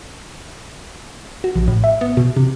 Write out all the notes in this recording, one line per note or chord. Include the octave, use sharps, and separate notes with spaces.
F#4
A#1
A2
E5
B3
B2
C3